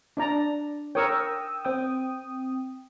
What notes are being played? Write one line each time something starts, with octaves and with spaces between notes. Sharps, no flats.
D4 D5 A#5
A#4 C#5 G5 D#6 E6
C4 G5 D#6